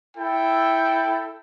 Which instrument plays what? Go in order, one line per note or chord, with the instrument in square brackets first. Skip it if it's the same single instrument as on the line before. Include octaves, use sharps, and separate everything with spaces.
[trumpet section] E4 A4 G5